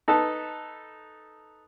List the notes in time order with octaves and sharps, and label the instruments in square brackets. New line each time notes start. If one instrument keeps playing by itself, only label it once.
[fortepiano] D#4 A4 B4 A5